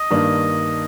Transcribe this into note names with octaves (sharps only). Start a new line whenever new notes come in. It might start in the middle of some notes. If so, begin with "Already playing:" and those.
Already playing: D#5
G2 D#3 A#3 D4